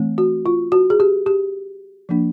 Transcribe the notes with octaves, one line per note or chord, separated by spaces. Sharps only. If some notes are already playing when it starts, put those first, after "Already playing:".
Already playing: E3 A3 C4
F#4
F4
F#4
G#4
G4
G4
F3 A#3 D4